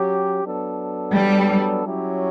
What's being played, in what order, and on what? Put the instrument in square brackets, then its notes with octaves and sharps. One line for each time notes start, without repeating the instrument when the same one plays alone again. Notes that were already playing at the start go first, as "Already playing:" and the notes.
Already playing: [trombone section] F#3 C#4 G4
F#3 B3 D4 A4
[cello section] G3
[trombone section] F#3 C#4 E4 G4